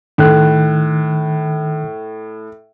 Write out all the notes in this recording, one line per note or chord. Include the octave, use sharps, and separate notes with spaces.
A2 D#3 F#6